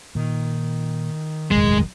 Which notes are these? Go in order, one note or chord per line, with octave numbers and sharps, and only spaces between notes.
A#2 D#3
E1 A1 F#2 G#3